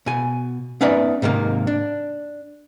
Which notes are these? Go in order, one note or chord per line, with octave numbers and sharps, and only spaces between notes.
B2 G#5
B3 C#4 D#4 B4 D5 E5
G#2 C3 D#3 A#3
D4